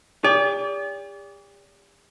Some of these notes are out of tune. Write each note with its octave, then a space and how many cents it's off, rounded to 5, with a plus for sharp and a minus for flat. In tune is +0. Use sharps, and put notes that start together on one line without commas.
G4 +45 D5 -35